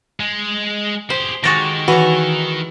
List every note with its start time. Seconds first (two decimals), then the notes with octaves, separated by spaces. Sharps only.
0.20 G#3
1.10 G4 G#4 C5
1.44 D#3 G#3 F#4 G4 C#6 A6 A#6
1.88 E3 F#4 B4 C#5 F#5